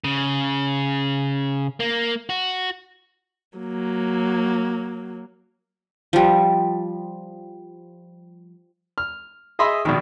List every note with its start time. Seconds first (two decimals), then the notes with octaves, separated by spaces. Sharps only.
0.04 C#3
1.80 A#3
2.30 F#4
3.58 F#3 A#3
6.13 F3 G3
8.98 F6
9.59 G#4 D#5 E5 B5 C6
9.85 A#1 B2 D#3